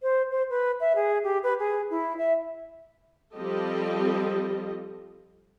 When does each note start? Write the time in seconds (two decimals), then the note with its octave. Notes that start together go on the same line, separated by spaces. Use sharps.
0.03 C5
0.31 C5
0.50 B4
0.80 E5
0.96 G#4
1.24 G4
1.43 B4
1.59 G#4
1.90 E4
2.17 E5
3.34 F3 G3 C4 G4 A4 D#5